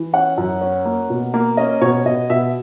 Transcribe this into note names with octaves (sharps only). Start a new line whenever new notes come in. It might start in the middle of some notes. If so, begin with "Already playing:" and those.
Already playing: E3
C#4 F#5
F#2
C#4
A#3
B2
A#3
C#4 D#5
B2 C#5
B2 D#5
B2 E5